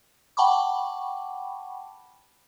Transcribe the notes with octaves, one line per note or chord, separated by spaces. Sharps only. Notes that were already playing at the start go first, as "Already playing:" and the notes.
F#5 G5 A5 B5 C#6 D6